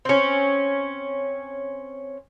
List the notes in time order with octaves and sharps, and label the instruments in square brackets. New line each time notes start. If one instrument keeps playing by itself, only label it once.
[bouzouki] C4 C#4